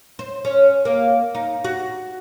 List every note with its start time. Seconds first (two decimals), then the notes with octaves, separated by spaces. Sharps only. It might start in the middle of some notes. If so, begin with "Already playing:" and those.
0.19 C5
0.45 C#4
0.85 A#3
1.35 D#4
1.64 F#4